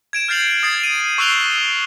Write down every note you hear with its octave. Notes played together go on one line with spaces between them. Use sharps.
G#6 D7 E7
F6 G6 A6 C7 F7 F#7
D#6 G#6 A6 C7
D#7
C#6 E6 F#6 C7 F7 G7
E6